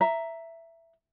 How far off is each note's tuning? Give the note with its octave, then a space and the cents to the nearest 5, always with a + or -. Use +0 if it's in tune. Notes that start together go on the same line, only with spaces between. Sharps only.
E5 +10 A#5 +0